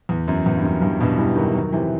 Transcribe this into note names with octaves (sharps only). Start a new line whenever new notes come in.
E2
F#2
E2
G2
F#2
E2 G2
G2 B2
E3 G3
D#3 F#3
D#3 F#3
C3 E3